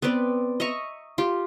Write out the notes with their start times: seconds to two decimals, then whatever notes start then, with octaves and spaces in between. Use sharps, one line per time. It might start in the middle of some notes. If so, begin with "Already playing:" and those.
0.02 B3 C4 B4 D5
0.60 D#5 E5 A#5 C#6
1.18 F4 G4